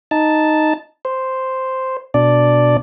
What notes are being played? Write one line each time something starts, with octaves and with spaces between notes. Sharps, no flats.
D#4 A5
C5
B2 D4 D5